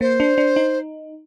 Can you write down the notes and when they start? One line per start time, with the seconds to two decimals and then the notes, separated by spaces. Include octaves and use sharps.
0.01 A#3 C5
0.20 D4
0.38 D4
0.56 D#4